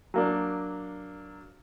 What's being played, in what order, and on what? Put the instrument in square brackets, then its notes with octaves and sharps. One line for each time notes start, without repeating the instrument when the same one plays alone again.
[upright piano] F#3 A#3 D4